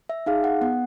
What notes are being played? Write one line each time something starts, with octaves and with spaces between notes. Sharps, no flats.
E5
D#4 G#4 F5
F#5
B3 F#5